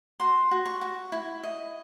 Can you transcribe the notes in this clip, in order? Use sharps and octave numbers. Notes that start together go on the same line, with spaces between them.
F#4 C6
F#4
C#6
F#4
E4
D#5